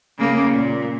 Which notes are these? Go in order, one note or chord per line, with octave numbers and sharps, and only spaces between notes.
C#3 A#3
A#2